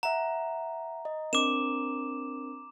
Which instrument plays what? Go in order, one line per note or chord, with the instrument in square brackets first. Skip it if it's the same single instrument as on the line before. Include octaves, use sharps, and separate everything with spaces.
[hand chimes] E5 F#5 [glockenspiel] A#5
[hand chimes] D#5
[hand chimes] C4 D4 A#4 [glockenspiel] D6 E7